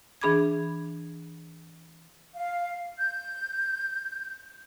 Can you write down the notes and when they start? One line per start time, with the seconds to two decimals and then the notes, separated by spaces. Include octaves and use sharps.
0.21 E3 D4 G#4 B5 D6 G#6
2.36 F5
2.98 G6